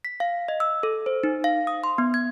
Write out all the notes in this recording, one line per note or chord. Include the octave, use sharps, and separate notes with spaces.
B6
F5
D#5
E6
A4
C5
D#4
F5
D#6
C6
B3
G#6